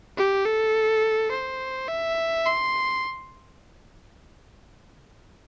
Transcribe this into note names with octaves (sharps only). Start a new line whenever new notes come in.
G4
A4
C5
E5
C6